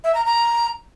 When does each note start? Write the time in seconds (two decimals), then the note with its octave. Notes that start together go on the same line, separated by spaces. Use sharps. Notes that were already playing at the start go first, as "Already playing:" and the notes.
0.04 E5
0.15 A#5
0.26 A#5